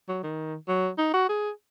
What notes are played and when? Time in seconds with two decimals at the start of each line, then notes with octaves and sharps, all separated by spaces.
0.08 F#3
0.23 D#3
0.68 F#3
0.98 D#4
1.14 F#4
1.29 G#4